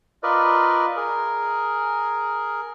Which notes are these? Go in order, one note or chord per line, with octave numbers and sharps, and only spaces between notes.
F4 A#4 B4 D5 D#5
G#4 A#4